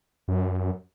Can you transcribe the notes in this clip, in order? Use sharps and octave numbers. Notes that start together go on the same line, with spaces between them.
F#2